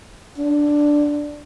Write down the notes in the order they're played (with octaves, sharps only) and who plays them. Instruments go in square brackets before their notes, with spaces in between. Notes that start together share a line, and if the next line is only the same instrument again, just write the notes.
[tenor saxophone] D4